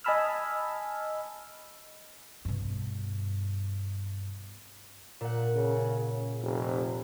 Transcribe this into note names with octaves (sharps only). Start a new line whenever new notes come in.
D#5 G#5 A5 B5 E6 F6
G2 B2
A#2 F#5
C#3
F1